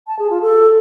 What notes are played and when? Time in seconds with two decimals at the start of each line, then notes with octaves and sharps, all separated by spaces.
0.07 A5
0.19 G#4
0.30 F4
0.41 A4